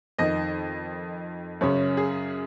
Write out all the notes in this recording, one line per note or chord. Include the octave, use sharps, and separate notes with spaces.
F2 D#3 D#5
F#2 C#3 C#5
G#4